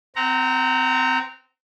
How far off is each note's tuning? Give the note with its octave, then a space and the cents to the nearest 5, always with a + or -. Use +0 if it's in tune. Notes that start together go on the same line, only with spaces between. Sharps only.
C4 -15 F#5 +30 A#5 -10